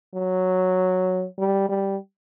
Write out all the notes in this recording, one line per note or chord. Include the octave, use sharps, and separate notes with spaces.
F#3
G3
G3